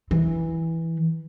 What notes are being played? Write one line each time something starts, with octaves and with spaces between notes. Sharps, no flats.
E3